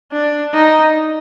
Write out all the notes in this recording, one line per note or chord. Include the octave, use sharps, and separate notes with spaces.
D4
D#4